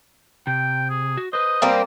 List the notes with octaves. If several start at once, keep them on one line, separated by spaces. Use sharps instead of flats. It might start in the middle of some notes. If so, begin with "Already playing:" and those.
C3 G5
G#4
F#4
B4 C5 D#5
G3 A#3 C4